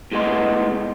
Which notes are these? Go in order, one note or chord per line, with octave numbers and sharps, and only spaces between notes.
A2 C3 G#3 B3 D#5 C6